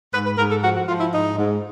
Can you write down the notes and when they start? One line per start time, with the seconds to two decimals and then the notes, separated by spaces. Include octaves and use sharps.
0.14 G#2 B4
0.26 B4
0.38 G#2 A#4
0.51 A4
0.63 F3 F#4
0.75 F#4
0.88 F3 F4
1.00 E4
1.12 G#2 D#4
1.37 G#2